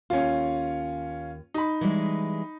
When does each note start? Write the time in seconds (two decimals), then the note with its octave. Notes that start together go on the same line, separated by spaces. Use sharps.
0.10 D#2 C#4 F4
1.54 D#4 B5
1.81 E3 G3 G#3